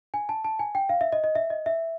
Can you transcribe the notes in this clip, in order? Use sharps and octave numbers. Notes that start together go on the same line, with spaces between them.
G#5
A5
A5
G#5
G5
F5
E5
D#5
D#5
E5
D#5
E5